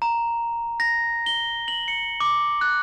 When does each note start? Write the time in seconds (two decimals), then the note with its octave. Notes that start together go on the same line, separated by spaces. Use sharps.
0.02 A#5
0.80 A#6
1.26 G7
1.68 F#7
1.88 C#7
2.20 D6
2.61 F#6